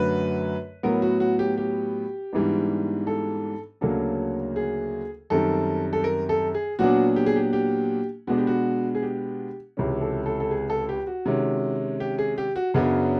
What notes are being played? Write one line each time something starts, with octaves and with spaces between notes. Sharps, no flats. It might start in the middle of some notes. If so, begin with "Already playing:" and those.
Already playing: F#2 D3 F#3 A3 B4
A2 F#3 B3 A#4
F#4
F#4
G4
G4
G#2 E3 G3 B3 D4
A4
D2 C#3 F#3 A#3 D4 A4
G#4
F#2 D#3 G3 C4 A4
A4
A#4
A4
G#4
A#2 F#3 B3 D4 F#4
G4
G#4
G4
G4
B2 G#3 B3 D4 F#4
G4
F#4
G#4
G4
C#2 C3 E3 G#3 C#4
A4
A4
A4
G#4
A4
G4
F#4
C3 D#3 G#3 C#4
G4
G#4
G4
F#4
F#2 C#3 F#3 B3 D4